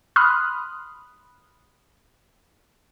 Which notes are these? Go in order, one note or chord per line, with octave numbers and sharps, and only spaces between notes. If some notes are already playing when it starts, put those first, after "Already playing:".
B5 C6 D#6 F6 F#6